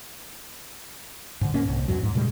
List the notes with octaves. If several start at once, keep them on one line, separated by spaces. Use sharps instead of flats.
G#2 D3
D2 G#2 A#3 C#4
C2
E2 G#2 F#3
G#2
A#2 C#3 G3 G#3